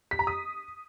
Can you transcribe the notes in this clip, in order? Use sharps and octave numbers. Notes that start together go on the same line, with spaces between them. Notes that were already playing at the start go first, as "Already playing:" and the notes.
B6
A#5
D#6